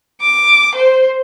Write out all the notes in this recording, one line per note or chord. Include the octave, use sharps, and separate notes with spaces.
D6
C5